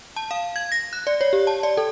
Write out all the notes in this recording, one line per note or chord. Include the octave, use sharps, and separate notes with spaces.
A5
F5
G#6
A#6
F#6
D5
C#5
G4
A5
D5
A4